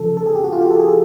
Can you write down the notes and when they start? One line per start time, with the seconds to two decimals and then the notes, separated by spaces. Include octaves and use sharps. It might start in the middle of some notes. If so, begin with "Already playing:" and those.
Already playing: C#3 F3 A4
0.17 A4
0.26 G#4
0.35 G4
0.44 F#4
0.53 F4
0.61 G4
0.71 A4
0.79 G#4
0.89 A4